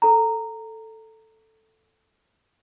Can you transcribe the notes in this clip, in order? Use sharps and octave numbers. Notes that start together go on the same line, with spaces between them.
A4 A#5